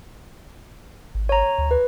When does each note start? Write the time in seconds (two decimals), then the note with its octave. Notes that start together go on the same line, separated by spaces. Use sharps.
1.15 G#1
1.29 C#5 A#5
1.58 D2
1.71 B4